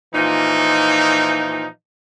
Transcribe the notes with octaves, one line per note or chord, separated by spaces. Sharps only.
A#2 E3 F3 D#4